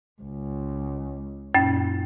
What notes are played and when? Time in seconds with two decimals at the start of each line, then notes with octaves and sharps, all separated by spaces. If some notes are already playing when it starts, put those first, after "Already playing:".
0.22 C#2
1.54 F#2 A#2 C#4